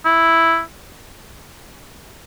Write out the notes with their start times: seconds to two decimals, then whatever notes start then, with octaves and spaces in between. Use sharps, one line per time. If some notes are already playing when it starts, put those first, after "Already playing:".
0.05 E4